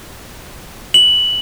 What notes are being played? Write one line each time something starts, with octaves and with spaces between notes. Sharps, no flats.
F#7